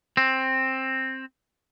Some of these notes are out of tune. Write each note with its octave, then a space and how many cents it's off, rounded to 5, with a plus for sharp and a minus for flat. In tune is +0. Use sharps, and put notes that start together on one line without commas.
C4 +10